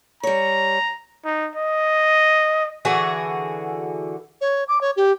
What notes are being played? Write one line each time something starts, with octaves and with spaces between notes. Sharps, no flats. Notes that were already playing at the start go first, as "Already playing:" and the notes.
G3 C#5 A#5
D#4
D#5
D3 E3 F#4 G#4
C#5
D6
C#5
G4